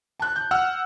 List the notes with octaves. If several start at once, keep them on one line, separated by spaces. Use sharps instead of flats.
A5 F#6
G6
F#5 E6 F6